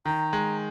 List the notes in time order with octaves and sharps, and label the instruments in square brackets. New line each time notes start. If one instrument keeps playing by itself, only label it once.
[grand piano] D#3 [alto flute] A#5
[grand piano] G#3